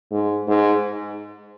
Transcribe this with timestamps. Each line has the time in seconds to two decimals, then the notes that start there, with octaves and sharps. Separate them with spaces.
0.12 G#2
0.47 G#2